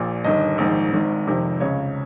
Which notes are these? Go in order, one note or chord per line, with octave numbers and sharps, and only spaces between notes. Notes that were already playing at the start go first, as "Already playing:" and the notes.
Already playing: A#1 A#2
G1 G2 D#3 D#5
A#1 G#2 D#3
G#1 G#2 D#3
F1 F2 C3 D#3
C#2 C#3 C#5